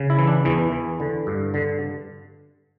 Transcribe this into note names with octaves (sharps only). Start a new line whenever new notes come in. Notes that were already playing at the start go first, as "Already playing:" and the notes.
Already playing: C#3
E4
E3
D4
E2 E3
E3
D3
G2
D3